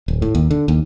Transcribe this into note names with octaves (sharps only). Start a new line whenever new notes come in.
D1
A2
D#2
D3
D#2